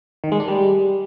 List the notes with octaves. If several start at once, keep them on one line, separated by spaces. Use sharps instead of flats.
D#3
G#3
D4
G3